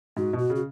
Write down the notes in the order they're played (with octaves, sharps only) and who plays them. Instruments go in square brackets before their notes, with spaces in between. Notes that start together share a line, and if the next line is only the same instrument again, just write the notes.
[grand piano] G#2 [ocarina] F#4
[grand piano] B2
[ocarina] F#4
[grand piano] C#3
[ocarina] F#4